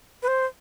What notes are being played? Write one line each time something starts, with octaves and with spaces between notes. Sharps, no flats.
B4
C5